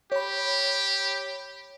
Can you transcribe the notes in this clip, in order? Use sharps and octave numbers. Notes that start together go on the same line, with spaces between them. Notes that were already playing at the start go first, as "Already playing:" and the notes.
G4 C#5 B5